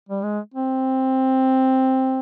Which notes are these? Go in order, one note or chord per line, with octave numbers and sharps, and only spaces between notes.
G3
G#3
C4